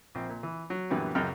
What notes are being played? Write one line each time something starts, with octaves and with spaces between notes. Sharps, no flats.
A#1 C4
A#2
E3
F#3
F#2 A#2 D3 E3 G3 B3
C#2 F#2 G#3 F#5 G5 F6